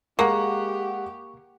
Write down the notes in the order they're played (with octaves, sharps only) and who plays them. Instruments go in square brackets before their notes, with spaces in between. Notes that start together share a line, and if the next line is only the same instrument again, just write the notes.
[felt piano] G#3 F#5 [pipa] A#3 [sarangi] G4 [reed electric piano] C#6